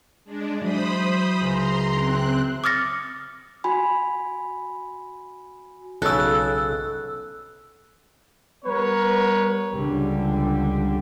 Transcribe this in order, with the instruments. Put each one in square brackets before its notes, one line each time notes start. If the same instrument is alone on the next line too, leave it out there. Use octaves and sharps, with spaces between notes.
[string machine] G#3 D4
[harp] E3 F#3 [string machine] C5 B5 D#6
[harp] C#2 [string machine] A#5 C6
[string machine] C4 F#6 [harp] E4
[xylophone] D6 D#6 F6 A6 A#6 C#7
[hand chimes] F#4 G#5 B5
[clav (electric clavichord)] B1 C#3 [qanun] A4 [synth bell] E6 F#6
[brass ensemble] G3 B3 A#4 B4 C#5
[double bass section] C#2 D3 G3